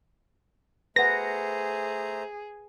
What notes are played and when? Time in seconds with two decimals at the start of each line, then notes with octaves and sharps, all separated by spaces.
0.96 A3 G#4 B4 C5 F#5 A#5 A#6